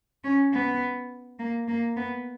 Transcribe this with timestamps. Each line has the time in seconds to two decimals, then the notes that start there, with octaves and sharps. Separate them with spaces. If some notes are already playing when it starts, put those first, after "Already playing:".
0.24 C#4
0.53 B3
1.39 A#3
1.68 A#3
1.97 B3